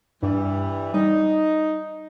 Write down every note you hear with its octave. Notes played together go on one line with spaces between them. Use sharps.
G2 E3 G3
G3 D#4